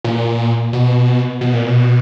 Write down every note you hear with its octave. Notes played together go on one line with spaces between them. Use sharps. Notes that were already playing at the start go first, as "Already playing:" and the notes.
A#2
B2
B2
A#2
B2